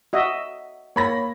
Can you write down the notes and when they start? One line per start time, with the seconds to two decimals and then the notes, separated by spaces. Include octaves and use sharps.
0.13 F#4 D#5 E5
0.96 A#3 C#5 B5 A#6